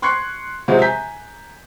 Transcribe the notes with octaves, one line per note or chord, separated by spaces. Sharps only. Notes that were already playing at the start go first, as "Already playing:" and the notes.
C6 C#6 F#6 G#6 C7 C#7
C3 F3 F#3 G#3 C4
G#5 A#5 G6 B6